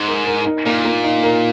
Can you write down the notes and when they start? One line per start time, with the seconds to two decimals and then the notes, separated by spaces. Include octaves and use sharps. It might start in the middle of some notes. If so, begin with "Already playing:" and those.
Already playing: G#2 D#4
0.08 A#4
0.27 A#4
0.46 D#4
0.66 A#2 A#3
0.85 A#3
1.04 D#4
1.24 A#4